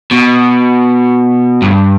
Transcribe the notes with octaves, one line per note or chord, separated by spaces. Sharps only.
B2
G2